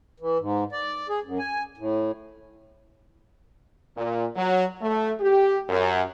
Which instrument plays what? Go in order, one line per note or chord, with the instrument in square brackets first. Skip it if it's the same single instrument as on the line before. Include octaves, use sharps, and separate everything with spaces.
[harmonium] E3
G#2
D5
G#4
F#2
G#5
A2
[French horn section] A#2
F#3
A3
G4
F#2